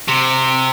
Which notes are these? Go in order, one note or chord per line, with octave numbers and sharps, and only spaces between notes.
C3